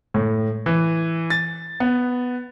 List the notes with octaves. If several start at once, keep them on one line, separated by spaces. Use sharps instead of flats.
A2
E3
A6
B3